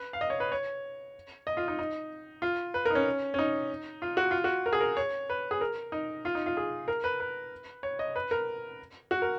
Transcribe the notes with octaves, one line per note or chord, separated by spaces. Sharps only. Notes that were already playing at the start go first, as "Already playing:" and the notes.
Already playing: B4
F5
D#5
C#5
B4
C#5
D#5
F4
D#4
D#4
F4
B4
A#4
D#4
C#4
C#4
D#4
F4
F#4
F4
F#4
A#4
G#4
A#4
C#5
B4
G#4
A#4
D#4
F4
D#4
F4
G#4
A#4
B4
B4
C#5
D#5
B4
A#4
F#4
A#4